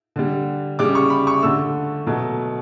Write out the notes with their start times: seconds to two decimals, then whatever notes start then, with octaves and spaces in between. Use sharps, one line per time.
0.16 D3 G3
0.79 C#3 G3 D6
0.95 C#6
1.10 B5
1.27 C#6
1.43 D3 A3 E6
2.07 B2 F#3 A3